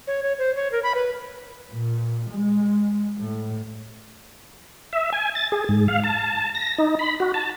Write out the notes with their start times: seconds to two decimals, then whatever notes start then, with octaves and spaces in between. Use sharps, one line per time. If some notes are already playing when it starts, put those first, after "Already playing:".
0.07 C#5
0.23 C#5
0.39 C5
0.56 C#5
0.72 A#4
0.83 B5
0.95 B4
1.71 A#2
2.30 G#3
3.18 A2
4.93 E5
5.13 G#5
5.35 A6
5.52 G#4
5.69 G#2
5.88 F5
6.04 A5
6.55 A#6
6.78 D#4
6.99 B5
7.20 F#4
7.34 A5